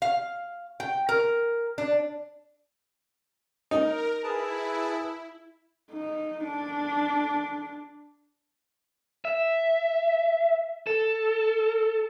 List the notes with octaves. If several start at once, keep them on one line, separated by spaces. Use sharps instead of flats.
F5
G5
A#4
D4
D#4 A#4
E4 G#4 B4 A5
D#4
D4
E5
A4